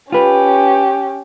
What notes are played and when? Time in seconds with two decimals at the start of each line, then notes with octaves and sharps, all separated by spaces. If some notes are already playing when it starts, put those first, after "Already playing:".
0.12 C#4 F4 G4 B4